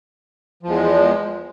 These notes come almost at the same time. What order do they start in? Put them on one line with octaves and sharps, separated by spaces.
F3 E2 G#3